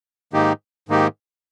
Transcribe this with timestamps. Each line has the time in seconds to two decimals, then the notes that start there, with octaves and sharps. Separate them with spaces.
0.33 G#2 D#3 A#3 D#4 G4
0.89 G#2 D#3 A#3 D#4 G4